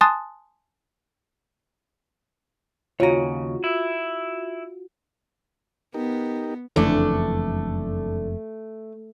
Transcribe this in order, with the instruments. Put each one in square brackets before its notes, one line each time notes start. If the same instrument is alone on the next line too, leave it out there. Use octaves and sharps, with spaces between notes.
[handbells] G#5 A5 C6 D#6 F#6 A6
[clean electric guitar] D#2 C#3 [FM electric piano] F4 F#4 [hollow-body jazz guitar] C#5 A#5
[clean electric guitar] E4
[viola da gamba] B3 [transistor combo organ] D#4 G4 A#4
[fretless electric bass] F#1 F2 E3 [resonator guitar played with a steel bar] D3 D4 [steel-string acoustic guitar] A3